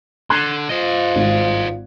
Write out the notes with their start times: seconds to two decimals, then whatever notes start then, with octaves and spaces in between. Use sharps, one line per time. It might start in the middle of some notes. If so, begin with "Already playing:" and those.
0.30 D3 C6 F#6 G#6
0.69 F4 C5 D#5
1.16 G#1 G#2